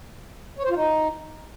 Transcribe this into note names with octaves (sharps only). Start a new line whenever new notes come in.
C#5
C5
F4
D#4